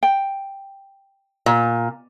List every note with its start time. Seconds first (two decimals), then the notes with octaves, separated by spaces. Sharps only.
0.03 G5
1.46 A#2